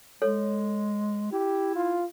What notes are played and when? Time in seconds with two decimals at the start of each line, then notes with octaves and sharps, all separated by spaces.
0.22 G#3 A4 C#5
1.32 E4 G4
1.75 F4